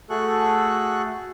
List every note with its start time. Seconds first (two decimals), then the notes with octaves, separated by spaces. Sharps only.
0.10 A3 F#4 G#4 A4 C#6 F#6